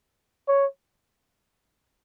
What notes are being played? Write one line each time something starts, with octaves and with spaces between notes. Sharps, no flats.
C#5